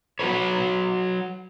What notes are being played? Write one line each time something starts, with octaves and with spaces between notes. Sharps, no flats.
F#3 F#4 G#4 B4 C#5